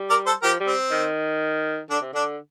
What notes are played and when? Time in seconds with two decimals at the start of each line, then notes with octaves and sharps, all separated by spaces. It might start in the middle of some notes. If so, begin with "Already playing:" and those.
Already playing: G3
0.10 A#4 D5
0.26 A4 C5
0.42 F3 G4 A#4
0.60 G3
0.67 C4
0.92 D#3
1.90 D3 D4
2.01 C3
2.13 D3 D4